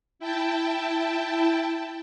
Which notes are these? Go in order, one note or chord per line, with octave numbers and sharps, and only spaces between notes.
E4 G5 A5